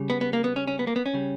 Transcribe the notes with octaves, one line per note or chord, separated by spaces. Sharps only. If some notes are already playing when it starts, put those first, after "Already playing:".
Already playing: C#3 G3
B3
B3
A#3
B3
C#4
C#4
B3
A#3
B3
C#4
C#3 G3